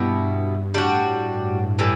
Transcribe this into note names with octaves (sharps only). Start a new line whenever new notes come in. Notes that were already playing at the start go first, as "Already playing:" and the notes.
Already playing: G2 B2 G3 B3 E4
G2
A2 G3 D4 F#4
G2
A2 E3 G3